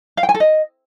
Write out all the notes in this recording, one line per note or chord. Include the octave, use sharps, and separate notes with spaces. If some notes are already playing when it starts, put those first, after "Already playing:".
F5
G5
G#5
A4
D#5